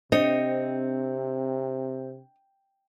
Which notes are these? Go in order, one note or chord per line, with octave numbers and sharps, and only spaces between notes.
C3 C4 D4 C5 D#5 C#7